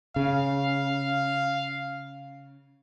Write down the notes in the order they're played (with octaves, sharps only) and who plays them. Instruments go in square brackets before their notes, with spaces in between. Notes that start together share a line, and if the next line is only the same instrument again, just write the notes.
[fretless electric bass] C#3 [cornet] F5